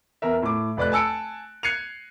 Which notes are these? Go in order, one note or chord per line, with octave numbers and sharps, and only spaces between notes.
E2 A#4 E5
A2 D6
F1 B4 D5 B5 F#6
G#5 A5 E6 C#7 D7
F#6 G#6 C7 C#7 D#7 F7